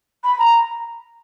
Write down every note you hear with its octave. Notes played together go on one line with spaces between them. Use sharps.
B5
A#5